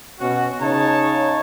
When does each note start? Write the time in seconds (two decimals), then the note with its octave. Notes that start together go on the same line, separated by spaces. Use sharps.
0.20 B2 C#4 F#4
0.61 C#3 D#4 C#5 A5